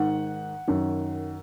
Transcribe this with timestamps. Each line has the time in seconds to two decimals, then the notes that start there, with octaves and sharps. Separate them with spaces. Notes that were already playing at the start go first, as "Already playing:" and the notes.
Already playing: G#2 D#3 F#5
0.67 F#2 D#3